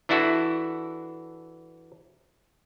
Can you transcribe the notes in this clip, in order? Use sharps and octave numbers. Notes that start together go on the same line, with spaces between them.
E3 D4 E4 F#4 A4